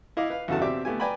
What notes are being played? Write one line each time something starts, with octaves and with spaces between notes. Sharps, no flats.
E4 D#5 F5 D6
B4 F5
E2 G2 C#3 F#4 A4 A5
B2 C4 G4 D5 E5 D6
A3 B3 G4 G#5
B4 D5 G5 G#5 A#5 B5